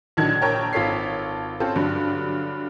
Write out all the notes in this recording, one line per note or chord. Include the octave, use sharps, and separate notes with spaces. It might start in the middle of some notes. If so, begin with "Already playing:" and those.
A#1 D3 D#3 F#3 A5 G#6
A#1 A#4 C#5 G5 A5
G#1 F4 A4 C#5 B6 C7
C4 C#4 F4 A4 C5
G2 D3 F#3